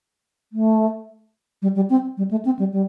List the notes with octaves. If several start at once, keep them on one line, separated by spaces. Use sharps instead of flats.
A3
G3
G3
C4
G3
A3
C4
G3
G3